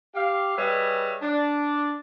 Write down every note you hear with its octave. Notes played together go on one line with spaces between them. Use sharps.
G4 F5
G3 G#4 B4 C#5 D#5 E5
D4